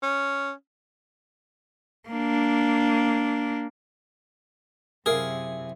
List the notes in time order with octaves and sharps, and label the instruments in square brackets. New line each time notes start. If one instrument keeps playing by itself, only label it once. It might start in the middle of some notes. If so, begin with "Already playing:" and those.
[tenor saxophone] C#4
[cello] A#3 D4
[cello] F#2 C3 [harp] E4 [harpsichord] G#4 [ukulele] A#4 F5